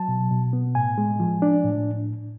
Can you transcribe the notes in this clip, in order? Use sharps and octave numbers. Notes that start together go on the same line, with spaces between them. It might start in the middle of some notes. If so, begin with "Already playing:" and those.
Already playing: F#3 A5
B2
B2
B3
A2 G#5
G#3
F3
D4
A2